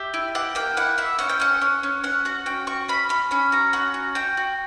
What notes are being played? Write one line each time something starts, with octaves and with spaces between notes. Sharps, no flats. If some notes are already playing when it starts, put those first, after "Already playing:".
Already playing: G4 E5
E4
G4 F#5
A#3 G5
E4 F#5
E4 E5
C#4 F#5
G5
C#4 F#5
C#4
C#4
C#4 F#5
F#4 F#5
C#4 G5
F#4 C#6
C#4 B5
C#4 B5
C#4 B5
F#4 A#5
C#4 F#5
F#4
F#4 G5
F#4